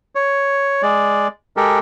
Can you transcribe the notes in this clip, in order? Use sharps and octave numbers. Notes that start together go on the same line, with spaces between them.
C#5
G#3 D5
G#3 G4 A4 A#4